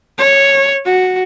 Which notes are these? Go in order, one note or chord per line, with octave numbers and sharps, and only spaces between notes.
C#5
F#4